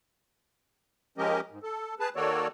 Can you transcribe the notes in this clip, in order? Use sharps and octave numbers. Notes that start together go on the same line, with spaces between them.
F3 G#3 C#4 G4 A#4 D#5
G#2
A4
G#4 B4 A5
D#3 A#3 F#4 A4 C#5 D5